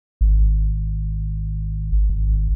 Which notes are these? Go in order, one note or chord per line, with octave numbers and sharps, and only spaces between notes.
G#1
G#1